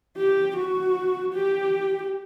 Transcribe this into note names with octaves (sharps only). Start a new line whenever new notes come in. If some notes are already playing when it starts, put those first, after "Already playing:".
G4
F#4
G4